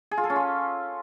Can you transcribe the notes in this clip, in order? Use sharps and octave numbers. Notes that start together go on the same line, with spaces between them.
G#4
F4
A4
C#4
F4